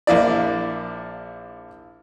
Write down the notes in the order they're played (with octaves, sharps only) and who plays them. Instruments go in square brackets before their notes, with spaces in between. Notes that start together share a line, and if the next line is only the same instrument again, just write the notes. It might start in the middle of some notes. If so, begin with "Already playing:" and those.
[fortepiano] A#1 A#3 E4 D5